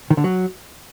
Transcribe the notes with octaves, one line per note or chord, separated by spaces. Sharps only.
D#3
D3
F#3